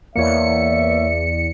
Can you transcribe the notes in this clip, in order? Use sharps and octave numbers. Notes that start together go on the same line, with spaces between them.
E2 A#3 C#5 D5 E5 C#7